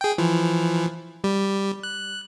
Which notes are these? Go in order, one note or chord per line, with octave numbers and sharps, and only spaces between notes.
G#4 G5
E3 F3
G3
F#6